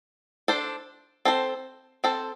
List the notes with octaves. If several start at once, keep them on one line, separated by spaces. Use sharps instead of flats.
D4 A4 C5
C4 A4 C5
C4 A4 C5